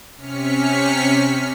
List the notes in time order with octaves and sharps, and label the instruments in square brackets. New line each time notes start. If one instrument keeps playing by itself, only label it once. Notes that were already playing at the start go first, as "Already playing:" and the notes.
[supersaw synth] C3 C#4 F6 B6 C#7